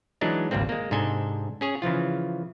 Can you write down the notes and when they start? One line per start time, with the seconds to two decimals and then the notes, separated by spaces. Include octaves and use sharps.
0.21 E3 F#3 G#3 D4 D#4
0.51 G#1 C#2 G3 A#3 C4
0.69 G#3 A#3
0.91 G#2 C3 D4 A4 D#5 G#5
1.61 C#4 G#4 C#5
1.82 C#3 E3 F3 F4